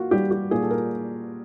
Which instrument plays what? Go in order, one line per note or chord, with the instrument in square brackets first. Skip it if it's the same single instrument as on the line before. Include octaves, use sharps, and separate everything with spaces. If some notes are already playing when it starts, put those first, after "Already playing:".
Already playing: [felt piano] A#3 F4 F#4
G3 G4
G4
A#2 G#4
A4
A#4